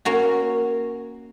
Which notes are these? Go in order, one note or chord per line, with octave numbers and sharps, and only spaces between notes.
A#3 C#4 F#4